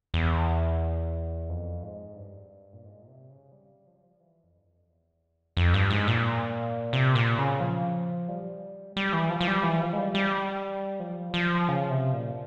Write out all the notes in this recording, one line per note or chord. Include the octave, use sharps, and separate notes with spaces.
E2
F2
G#2
G2
A#2
G#2
A#2
C3
C#3
G3
F3
G3
F3
E3
F2
G2
F2
E2
F2
G2
G#2
A#2
C3
A#2
C#3
F3
G3
G3
E3
F3
F3
G3
E3
F3
G#3
G3
G3
F3
F3
C#3
C3
A#2